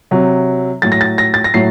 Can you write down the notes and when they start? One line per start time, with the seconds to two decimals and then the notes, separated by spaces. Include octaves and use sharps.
0.11 C3 F#3
0.82 A2 F#3 A6
0.92 A#6
1.01 A6
1.18 A#6
1.34 A6
1.44 A#6
1.54 A2 F#3 C7